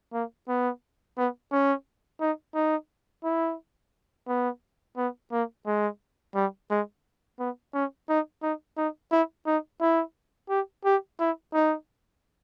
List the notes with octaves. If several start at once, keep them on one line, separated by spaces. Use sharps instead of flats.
A#3
B3
B3
C#4
D#4
D#4
E4
B3
B3
A#3
G#3
G3
G#3
B3
C#4
D#4
D#4
D#4
E4
D#4
E4
G4
G4
E4
D#4